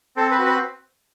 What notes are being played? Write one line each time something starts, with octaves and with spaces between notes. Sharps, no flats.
C4 A4
B4
F#4
B4